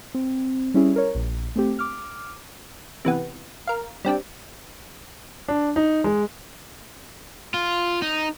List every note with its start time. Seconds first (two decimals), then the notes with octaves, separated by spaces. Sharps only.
0.14 C4
0.74 G3 C#4 E4 G#4
0.96 A#4 C#5
1.15 A#1
1.56 A3 C4 G4
1.79 D6 F6
3.05 C3 E3 B3
3.67 A#4 F5
4.05 G3 C4 D4 G4
5.48 D4
5.76 D#4
6.04 G#3
7.54 F4
8.02 D#4